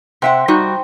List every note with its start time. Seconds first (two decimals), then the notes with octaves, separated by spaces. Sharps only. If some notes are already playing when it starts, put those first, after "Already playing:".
0.22 C3 C5 E5 F#5 G5
0.48 G3 D#4 F#4